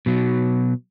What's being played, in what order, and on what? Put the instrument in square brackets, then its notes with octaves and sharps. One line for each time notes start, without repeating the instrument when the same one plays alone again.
[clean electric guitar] B2 F#3